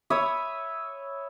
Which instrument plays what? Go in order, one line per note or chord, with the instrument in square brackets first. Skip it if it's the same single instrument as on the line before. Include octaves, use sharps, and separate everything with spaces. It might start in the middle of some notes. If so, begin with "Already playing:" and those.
[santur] C#5 E5 B5 D#6